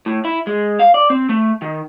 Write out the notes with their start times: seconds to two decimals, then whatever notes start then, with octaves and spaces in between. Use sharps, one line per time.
0.06 A2
0.25 E4
0.47 G#3
0.79 F5
0.94 D5
1.10 C4
1.29 A3
1.62 D#3